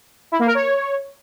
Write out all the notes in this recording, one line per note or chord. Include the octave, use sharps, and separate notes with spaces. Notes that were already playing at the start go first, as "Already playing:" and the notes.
E4
A#3
A#4
C#5